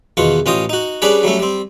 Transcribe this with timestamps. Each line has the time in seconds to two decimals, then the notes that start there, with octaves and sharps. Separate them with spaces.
0.17 E2 B2 D#3 F4 C#6
0.46 A1 C#4 F4 D#5 G5 D#6
0.69 D#4 F#4
1.02 G3 C#4 D4 G#4 B4 D5
1.23 F#3 G3 A3 C#4
1.39 G3 C4